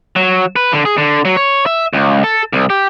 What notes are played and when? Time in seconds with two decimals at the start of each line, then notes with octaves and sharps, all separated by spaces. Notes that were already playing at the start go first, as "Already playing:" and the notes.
0.16 F#3
0.56 B4
0.73 D3
0.85 G#4
0.98 D3
1.25 F#3
1.37 C#5
1.66 E5
1.93 C#2
2.24 A4
2.53 C2
2.70 G4